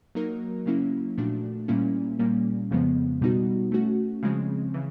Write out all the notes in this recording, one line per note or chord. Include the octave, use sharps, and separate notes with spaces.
F#3 A#3 D#4 F#4 A#4
C#3 F#3 A#3 C#4 E4
A#2 F3 A3 D4 F#4
A#2 G3 A#3 C#4 E4
A#2 G3 A#3 C#4
F2 C#3 F3 G#3 B3
B2 G3 B3 D#4 F#4
A3 C#4 F#4
C#3 F3 G#3 C4
C#3 E3